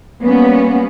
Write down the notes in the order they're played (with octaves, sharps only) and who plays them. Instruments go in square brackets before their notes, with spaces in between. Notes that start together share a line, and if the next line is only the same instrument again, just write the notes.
[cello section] G3 A#3 B3 C#4